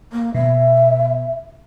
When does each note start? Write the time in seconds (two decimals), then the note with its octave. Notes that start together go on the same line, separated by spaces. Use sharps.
0.13 A#3
0.35 B2 E5